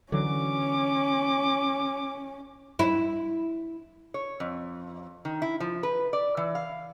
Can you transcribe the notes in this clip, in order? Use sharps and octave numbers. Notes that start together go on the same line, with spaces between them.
D3 E3 F#3 C#4 D6
E4
C#5
F2
D#3
E4
F3
B4
D5
E3
F5